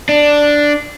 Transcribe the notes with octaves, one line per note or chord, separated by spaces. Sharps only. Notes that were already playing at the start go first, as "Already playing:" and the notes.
D4